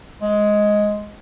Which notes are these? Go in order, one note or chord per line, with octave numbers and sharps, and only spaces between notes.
G#3